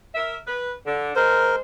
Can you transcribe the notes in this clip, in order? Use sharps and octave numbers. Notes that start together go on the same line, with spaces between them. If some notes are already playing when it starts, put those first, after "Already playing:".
A#4 E5
B4
D3
G#3 A#4 C5